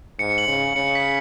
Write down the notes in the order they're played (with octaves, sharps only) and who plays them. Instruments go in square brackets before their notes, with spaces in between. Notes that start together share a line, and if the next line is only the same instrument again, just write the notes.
[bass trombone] G#2 [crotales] C#7
[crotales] F#7
[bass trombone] C#3
[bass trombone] C#3 [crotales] C#7
[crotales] B6